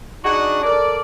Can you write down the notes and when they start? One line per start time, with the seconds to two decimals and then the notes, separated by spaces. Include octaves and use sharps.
0.23 D4 D#4 F#4 G#4 F#5
0.63 A4 A#4 D5